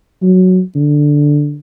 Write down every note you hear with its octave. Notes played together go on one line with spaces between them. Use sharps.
F#3
D3